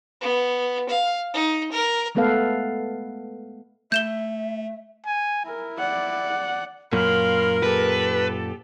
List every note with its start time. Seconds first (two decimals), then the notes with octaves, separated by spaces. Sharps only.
0.21 B3
0.89 F5
1.34 D#4
1.72 A#4
2.15 G#3 A3 B3 A4 B4 F5
3.92 A3 E5 G6 E7 G7
5.06 G#5
5.45 E4 A#4
5.79 D5 F#5
6.93 F#2 A#2 A#4 F5 B5 C6
7.63 G4 A4 B4